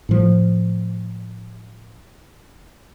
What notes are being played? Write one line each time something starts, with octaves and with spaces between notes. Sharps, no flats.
A2 F3